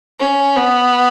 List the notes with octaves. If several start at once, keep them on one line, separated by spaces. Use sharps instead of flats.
C#4
B3